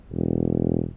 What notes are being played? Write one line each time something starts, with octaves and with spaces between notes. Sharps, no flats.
E1